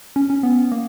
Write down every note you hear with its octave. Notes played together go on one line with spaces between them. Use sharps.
C#4
C#4
B3
A#3